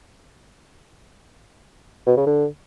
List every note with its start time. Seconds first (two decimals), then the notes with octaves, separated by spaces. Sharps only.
2.07 B2
2.17 C#3
2.27 D3